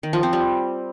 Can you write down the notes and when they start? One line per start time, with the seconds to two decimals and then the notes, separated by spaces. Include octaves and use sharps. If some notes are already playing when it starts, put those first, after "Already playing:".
0.03 D#3
0.13 F3
0.23 C4
0.33 G3